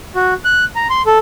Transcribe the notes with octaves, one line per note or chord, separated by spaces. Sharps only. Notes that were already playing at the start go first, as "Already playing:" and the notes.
F#4
F#6
A#5
C6
A4